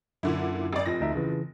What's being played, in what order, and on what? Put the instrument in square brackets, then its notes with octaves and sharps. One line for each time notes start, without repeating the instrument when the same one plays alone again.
[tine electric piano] F#2 [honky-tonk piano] A#2 D3 E4
[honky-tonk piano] G#1 D5
F1 F3 A#6
[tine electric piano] D2 D#4 E5
C#3 E3